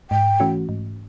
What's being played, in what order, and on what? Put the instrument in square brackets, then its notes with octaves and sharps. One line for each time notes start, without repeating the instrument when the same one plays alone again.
[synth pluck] G#2 [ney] G5
[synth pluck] E3 A3 C#4 F#4
G#2